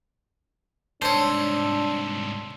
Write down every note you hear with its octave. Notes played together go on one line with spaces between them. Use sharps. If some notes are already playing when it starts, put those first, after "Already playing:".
C2 G#2 D4 C5 C#5 A5 C6 E6